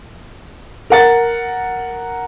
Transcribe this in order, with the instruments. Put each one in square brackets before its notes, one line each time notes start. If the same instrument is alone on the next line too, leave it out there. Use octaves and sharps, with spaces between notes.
[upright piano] A#4 F#5 A6